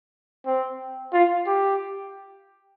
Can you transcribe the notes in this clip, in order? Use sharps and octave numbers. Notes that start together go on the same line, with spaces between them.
C4
F4
G4